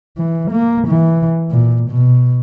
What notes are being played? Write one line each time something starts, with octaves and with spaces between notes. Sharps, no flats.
E3
A#3
E3
A#2
B2